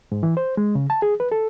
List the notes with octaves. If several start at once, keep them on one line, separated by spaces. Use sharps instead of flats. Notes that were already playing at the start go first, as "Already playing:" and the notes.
G#2
E3
C5
G#3
C#3
A5
G#4
B4
A4